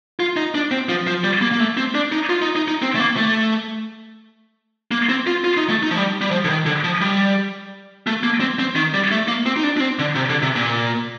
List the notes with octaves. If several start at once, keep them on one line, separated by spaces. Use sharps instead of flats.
F4
D#4
D4
C4
F3
F3
G3
A#3
A#3
A3
C4
D4
D#4
F4
D#4
D#4
D#4
C4
A3
A#3
A3
A#3
C4
F4
F4
D#4
A3
D#4
F3
G3
G3
F3
D3
D#3
D3
F3
G3
A3
A#3
C4
C4
D#3
G3
A3
A#3
C4
D#4
D4
D4
C4
D3
C3
D3
C3
A#2